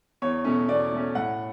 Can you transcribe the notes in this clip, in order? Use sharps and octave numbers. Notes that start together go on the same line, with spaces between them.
E2 C#5
B2 A3 C#4
E2 D5
B2 A3 C#4
A2 F#5